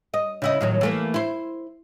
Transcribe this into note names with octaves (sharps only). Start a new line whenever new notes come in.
D#5
C#3 E4 D#5
A2 D#3 F#3
E3 A3 A#3
E4 C5